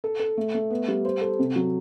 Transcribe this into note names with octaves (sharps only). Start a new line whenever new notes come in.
A4
A4
A3
A3
B3
G3
C5
A4
C3
F#3